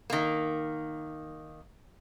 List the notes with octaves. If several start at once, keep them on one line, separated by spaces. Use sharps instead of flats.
D#3 A#3